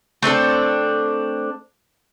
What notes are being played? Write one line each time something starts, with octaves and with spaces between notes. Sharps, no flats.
A3 C4 D4 A4